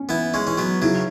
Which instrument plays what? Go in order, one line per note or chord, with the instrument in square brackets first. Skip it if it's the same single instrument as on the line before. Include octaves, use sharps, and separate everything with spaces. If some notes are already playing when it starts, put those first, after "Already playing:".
Already playing: [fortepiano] C#4
[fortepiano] E3 [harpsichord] B3 E4
[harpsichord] G#3 C#4
[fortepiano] E3 [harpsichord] C#4
[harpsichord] F#3 B3
[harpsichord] C#3 F#3 [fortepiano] E4